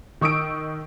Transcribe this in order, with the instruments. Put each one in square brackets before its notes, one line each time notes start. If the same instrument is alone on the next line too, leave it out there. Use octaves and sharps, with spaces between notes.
[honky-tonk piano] D#3 C#6 D#6 E6 D7